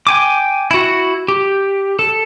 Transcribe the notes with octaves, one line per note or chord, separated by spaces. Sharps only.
G5 G#5 D6
E4 F#4
G4
A4